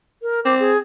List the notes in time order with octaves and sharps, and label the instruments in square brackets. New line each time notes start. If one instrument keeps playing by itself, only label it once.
[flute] A#4
[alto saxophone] C4 [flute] D6
[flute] G#4